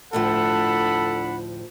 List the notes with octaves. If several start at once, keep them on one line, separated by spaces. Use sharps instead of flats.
D2 A2 F3 D4 A4 F#5 B5